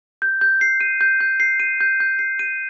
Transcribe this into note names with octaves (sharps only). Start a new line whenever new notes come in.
G6
G6
C7
D#7
G6
G6
C7
D#7
G6
G6
C7
D#7